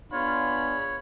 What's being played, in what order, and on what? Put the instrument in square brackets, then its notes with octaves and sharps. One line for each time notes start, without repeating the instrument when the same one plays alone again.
[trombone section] B3 D4 G#4 [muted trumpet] F4 [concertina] C#5 [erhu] B5